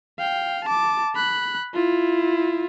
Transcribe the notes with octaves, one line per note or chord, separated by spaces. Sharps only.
F5 G5
A5 D6
B5 F#6
E4 F4